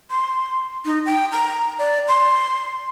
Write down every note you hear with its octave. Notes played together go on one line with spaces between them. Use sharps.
C6
D#4
G5
A#5
D5
C6